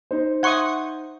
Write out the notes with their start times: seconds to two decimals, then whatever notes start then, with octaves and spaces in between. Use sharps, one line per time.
0.11 D#4 C5
0.43 E5 F#5 C6 C#6 D#6 G#6